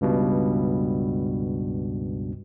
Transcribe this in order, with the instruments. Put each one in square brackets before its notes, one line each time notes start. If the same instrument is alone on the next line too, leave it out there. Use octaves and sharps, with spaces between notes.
[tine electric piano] C#2 G2 B2